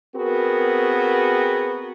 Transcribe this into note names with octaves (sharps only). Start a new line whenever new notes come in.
B3 C4 F#4 G#4 A#4